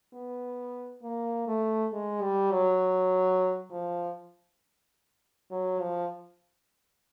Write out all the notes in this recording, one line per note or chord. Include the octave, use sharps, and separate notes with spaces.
B3
A#3
A3
G#3
G3
F#3
F3
F#3
F3